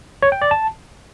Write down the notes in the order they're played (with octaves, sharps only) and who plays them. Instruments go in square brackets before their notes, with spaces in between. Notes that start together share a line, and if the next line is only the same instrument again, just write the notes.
[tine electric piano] C#5
G5
D5
A5